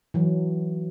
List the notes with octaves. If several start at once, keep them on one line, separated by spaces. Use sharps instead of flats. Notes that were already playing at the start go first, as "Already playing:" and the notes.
E3 F#3